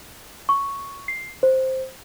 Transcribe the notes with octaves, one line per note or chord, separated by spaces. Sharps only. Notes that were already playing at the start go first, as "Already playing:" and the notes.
C#6
C7
C5